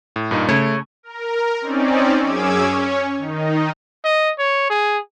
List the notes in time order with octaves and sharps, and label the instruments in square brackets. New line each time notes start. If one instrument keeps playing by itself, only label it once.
[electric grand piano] A2
G2 A#2 D#4
[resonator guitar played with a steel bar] C#3 C#5 A5 [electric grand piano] A3
[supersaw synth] A#4
C4 C#4 D#4 D5
F#2 C#4 G#4 D6 E6 G#6
C#4 C#5
D#3 D#4
[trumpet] D#5
C#5
G#4